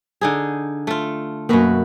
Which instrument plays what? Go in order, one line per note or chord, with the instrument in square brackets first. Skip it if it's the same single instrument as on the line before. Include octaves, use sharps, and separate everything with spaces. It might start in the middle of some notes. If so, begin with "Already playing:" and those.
[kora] D3 D#4 G#4
A3 F4
[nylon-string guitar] F#2 A#3 [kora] B2 F#4 B4